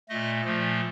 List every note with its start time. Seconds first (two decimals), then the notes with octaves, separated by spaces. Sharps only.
0.09 A#2 A3 D#5
0.45 A#2 F3 A3